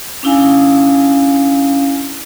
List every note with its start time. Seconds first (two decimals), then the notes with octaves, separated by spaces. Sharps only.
0.23 C#4 D4 E4 F5 G#5